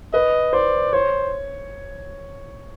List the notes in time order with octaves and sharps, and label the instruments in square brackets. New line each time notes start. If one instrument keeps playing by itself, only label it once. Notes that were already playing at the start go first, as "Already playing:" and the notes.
[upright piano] B4 [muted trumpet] D#5
[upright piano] C5 [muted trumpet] D5
[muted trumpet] C5 [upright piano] C#5